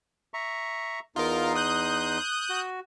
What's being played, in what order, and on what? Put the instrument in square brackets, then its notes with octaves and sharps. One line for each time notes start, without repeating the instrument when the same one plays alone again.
[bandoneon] E5 A#5 C#6
[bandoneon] E2 D#4 C6 [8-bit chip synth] F4 A#4
[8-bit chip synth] D#6 F#6 G6
[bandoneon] F#4